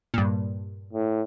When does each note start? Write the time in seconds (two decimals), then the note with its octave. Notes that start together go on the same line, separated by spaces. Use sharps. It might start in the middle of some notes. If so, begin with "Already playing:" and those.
0.14 G2 A#2
0.93 A2